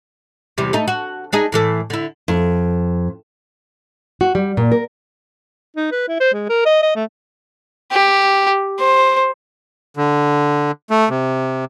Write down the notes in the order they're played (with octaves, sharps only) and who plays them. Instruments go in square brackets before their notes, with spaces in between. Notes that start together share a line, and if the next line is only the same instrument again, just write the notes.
[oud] E2 C3 G3
A3 D#4
F#4
D4 D#4 G#4
A2 E3 A4
D3 E4
[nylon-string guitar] F2
F#4
G3
A#2
A#4
[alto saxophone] D#4
B4
E4
C5
G#3
A#4
D#5
D#5
A3
[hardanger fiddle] G4
C5
[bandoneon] D3
A3
C3